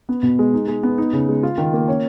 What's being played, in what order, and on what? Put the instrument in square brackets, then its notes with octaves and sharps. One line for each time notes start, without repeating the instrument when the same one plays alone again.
[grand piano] B3
B2
G#3
D#4
G#3
B3
D#4
C#3
G#3
F4
D#3
A#3
C#4